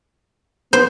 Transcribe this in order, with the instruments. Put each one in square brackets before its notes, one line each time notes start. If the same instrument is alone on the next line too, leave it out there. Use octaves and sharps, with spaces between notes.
[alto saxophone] B3 [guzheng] C5